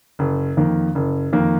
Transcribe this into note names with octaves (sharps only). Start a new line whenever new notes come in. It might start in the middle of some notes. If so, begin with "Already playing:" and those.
F#1
F2 D#3 A#3
F#1
F2 D#3 A#3